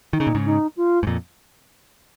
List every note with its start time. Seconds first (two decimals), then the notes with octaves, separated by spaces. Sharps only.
0.13 D#3 D#4
0.20 C#3
0.27 A#2
0.35 G#2 C#3
0.44 D#4
0.76 F4
1.03 G#2
1.07 F2 A#2